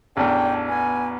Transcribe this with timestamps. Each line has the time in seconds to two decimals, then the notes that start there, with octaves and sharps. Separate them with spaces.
0.17 A1 E2 D4 G5
0.68 B3 G#5